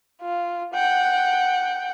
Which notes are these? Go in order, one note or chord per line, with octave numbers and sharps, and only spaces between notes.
F4
F#5 G5